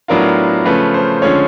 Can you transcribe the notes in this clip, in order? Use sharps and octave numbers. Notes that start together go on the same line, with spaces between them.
A2 F#3 B3 D4 F4 A#4
C#3 F3 A3 C#4 B4
C5
D3 F3 G#3 C#4 C#5